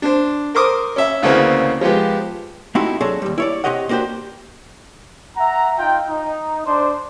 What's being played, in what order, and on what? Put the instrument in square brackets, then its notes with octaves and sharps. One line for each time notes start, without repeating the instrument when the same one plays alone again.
[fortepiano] D4 C5
A#4 C5 D6 D#6
C#4 E5
D2 C#3 E3 A#3 C4
F3 G#3 B3 G4
[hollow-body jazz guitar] A3 C4 D#4 E4 F#4 G4
F#3 D4 G#4 A4 C5 C#5
D#2 G3
E4 C#5 D5
C3 G4 C#5 D#5 F#5
A#3 D4 F#4 G4 C5
[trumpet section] E5 F#5 A#5
D#4 F4 G5
D#4
D4 C5